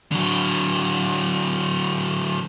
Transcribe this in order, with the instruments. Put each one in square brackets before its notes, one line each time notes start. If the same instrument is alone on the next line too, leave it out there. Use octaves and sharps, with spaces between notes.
[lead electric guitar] D3 F#3